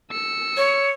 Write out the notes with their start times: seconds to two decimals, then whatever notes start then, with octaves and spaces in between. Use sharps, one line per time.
0.11 E6 C#7
0.57 C#5